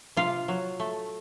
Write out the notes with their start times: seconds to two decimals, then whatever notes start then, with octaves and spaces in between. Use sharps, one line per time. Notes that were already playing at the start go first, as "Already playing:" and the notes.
0.17 C3 F4
0.48 F#3
0.80 A3